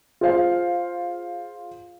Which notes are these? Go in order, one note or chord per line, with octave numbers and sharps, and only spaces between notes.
F4 G#4 C5 F5